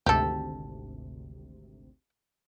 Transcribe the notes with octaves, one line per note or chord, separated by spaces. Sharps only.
G#1 D2 C3 G4 A4